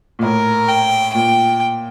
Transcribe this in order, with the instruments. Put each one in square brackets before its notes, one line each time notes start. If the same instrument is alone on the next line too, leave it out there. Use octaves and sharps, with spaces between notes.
[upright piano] A#2
[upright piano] A2 [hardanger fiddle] A#4
[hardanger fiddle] G5
[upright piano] A#2 [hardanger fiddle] G5